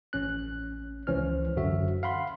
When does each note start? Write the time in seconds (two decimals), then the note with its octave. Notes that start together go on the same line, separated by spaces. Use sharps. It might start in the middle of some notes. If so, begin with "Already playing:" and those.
0.13 A1 C#4 F#6
1.07 C#2 E3 C#4 C5 F6
1.56 G1 F#2 D3 F#4 E5
2.03 F5 F#5 B5 C6